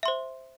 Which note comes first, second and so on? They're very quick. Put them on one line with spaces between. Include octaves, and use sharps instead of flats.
E5 C6 C5